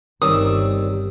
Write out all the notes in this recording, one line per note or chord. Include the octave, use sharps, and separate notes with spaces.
G1 C3 D#3 G3 A#4 C#5 D#6 E6